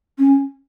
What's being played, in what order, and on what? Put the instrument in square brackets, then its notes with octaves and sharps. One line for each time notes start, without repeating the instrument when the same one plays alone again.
[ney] C#4